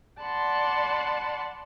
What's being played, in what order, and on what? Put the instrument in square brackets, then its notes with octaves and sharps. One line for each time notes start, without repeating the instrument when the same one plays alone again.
[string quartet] D5 F#5 A5 B5 C6